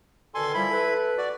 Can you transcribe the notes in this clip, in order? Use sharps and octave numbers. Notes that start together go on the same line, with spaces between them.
B2 D3 D#3 A4 G#5 C6
F3 G3 E4 B5
A4 B4
F#4 D5